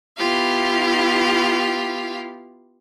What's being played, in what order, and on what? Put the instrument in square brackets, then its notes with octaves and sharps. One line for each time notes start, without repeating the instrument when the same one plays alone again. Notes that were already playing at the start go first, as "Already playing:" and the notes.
[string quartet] B3 E4 F4 G4 F5